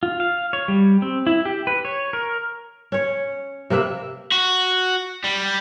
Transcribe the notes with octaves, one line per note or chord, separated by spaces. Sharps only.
F4
F5
C#5
G3
C4
E4
G4
B4
C#5
A#4
C#4 C#5
C3 A#3 B4 E5
F#4
G3